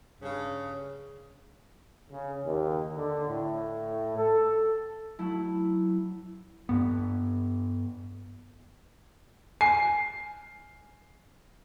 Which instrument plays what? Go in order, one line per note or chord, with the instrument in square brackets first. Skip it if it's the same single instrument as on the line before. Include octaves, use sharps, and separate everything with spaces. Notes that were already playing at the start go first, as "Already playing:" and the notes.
[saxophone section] G2 C#3
[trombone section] C#3
D#2
D3
A2
A4
[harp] F#3 A3 E4
[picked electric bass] G2 B3
[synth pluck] G#5 [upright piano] C7